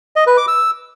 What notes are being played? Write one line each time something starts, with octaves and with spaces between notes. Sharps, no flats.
D#5
B4
D6
E6